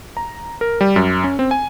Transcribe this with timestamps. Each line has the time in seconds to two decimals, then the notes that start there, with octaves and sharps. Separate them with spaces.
0.17 A#5
0.61 A#4
0.81 G3
0.96 F#2
1.24 C#4
1.39 C4
1.51 G#5